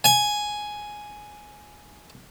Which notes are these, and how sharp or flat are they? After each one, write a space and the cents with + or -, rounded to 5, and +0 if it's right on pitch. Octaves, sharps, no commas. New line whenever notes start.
G#5 +5